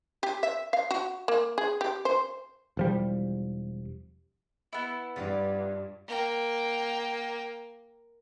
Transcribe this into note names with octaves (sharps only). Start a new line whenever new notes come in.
G4
E5
F5
F#4
A#3
G#4
G4
C5
E1 F3 G3
B3 E4
G2 F4 G4 D5
A#3 G5